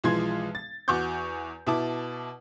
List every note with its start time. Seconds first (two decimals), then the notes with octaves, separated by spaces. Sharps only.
0.04 B1 E3 F3 G#3 C6 G#6
0.55 A6
0.88 E2 F#4 C#6 D6 G6
1.67 B2 E4 A5 D6